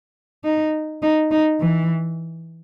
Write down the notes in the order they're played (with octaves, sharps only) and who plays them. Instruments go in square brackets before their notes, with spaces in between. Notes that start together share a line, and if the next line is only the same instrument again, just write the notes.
[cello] D#4
D#4
D#4
E3